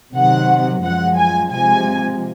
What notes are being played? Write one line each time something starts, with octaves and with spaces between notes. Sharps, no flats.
C3 D#3 F#3 F#5
F#2 F3 G#3 F#5
G#5
C3 F3 G#3 G#5